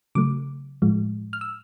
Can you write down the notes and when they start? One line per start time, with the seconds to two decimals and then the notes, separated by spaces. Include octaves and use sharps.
0.15 C#3 F#3 A3 D6
0.82 A2 F3 G#3
1.33 F6
1.41 E6